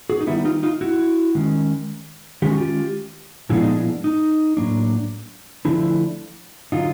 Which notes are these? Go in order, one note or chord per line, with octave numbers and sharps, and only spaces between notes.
F#4 G#4
D#4
D#3 G3 B3 E4
D#4 F4
D#4 F4
E4 F#4
D#3 G#3 C#4
D#3 G#3 C#4 G4
F#4
F4 G4
A#2 F3 G#3 B3 D4 E4
D#4
E4
D#4
A2 F#3 A#3 D4
D3 F3 A3 D4 E4
D3 F#3 D#4 F4